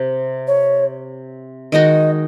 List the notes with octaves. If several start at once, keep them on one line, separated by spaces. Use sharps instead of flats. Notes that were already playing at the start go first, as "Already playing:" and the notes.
Already playing: C3
C#5
D#3 G#3 D#4 F#4 D#5